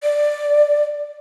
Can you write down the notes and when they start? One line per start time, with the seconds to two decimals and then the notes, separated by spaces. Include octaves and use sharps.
0.03 D5